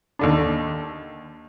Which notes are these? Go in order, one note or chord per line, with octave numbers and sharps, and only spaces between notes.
D#2 D3 D4